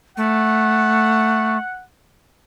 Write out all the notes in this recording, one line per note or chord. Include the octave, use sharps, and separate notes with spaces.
A3 F#5